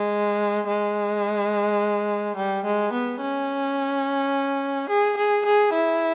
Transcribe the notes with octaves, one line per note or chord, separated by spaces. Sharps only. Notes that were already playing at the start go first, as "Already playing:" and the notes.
Already playing: G#3
G#3
G3
G#3
B3
C#4
G#4
G#4
G#4
E4